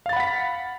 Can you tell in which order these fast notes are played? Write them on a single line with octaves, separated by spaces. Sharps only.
F5 A6 B5 F#5 B6